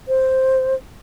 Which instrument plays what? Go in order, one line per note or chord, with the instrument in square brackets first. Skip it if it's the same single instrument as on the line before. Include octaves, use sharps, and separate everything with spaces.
[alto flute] C5